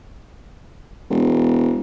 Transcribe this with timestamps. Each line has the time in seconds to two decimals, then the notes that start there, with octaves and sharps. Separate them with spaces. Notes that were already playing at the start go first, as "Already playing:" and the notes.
1.10 E1